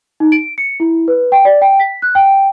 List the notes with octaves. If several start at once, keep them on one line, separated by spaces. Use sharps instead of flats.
D#4
D7
C#7
E4
B4
G5
D5
G5
B6
F#6
G5